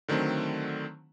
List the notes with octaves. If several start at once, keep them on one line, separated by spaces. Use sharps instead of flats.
D3 D#3 F#3 A3 C4